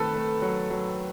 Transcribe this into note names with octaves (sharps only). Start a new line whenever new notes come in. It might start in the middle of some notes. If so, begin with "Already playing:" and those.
Already playing: D#3 A3 C4 A4 B4
A3
F#3
F#3